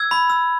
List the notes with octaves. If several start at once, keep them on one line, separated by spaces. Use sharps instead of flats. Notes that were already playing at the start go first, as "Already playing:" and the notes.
Already playing: E6 G#6
B5
E6